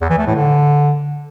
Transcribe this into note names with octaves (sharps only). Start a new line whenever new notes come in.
E2
E3
A3
A2
D3